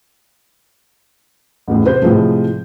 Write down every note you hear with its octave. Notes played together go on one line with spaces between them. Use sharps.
A1 E2 A2
C3 B4 C5 G6
A2 C3 F3 G#3 A3